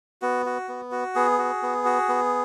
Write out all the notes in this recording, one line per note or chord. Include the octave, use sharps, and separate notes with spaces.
B3 F#4
F#4
B3
F#4
B3 G#4
F#4
B3
F#4
B3